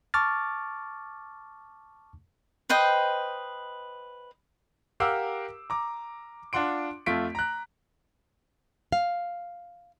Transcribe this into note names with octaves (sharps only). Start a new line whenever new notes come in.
A5 C#6 D6 F6 A6
B4 C5 D#5 G5
G4 A#4 F5 F#5 D6 E6
A#5 D6
D4 F4 F#5 C6 D7
F2 A3 F4 B6 D7
A#5 F#6
F5